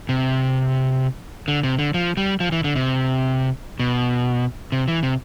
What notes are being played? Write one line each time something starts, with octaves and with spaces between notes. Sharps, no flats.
C3
D3
C3
D3
F3
G3
F3
E3
D3
C3
B2
C3
E3
C3